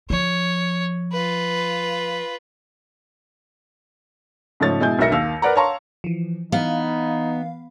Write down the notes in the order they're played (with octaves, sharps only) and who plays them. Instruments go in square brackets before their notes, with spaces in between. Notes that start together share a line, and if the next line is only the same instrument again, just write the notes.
[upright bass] F3 [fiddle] C#5
[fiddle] F4 B4
[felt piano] G#2 C#3 F3 A3 C#5 A6
B2 G#3 E4 G#5 G6
B1 A#4 E5 A#6 C#7
D#2 F5 E6
A#4 B4 D5 F#5 A#5
C#5 F5 A5 A#5 C6 C#6
[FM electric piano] E3 F3
[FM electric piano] E3 F5 [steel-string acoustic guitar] B3 [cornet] D#4